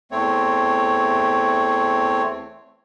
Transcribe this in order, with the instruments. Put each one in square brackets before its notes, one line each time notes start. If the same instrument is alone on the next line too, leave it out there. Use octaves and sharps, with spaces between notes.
[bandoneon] E2 A3 C4 C#5